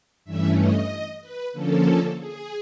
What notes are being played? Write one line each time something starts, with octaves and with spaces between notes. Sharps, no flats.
G2 E3 A3 C#4 E5
D#5
B4
D3 F3 A#3 C#4 A4
G#4